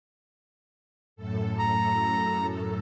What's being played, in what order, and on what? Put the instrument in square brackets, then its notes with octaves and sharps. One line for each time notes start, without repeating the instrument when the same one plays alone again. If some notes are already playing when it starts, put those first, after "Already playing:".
[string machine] F#2 A2 A4
[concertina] A#5